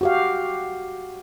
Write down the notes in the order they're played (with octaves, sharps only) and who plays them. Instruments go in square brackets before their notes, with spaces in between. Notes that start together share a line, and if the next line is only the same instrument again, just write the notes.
[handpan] F#4 G4 F5